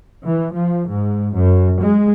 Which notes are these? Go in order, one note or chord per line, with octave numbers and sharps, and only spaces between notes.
E3
F3
G#2
F#2
G#3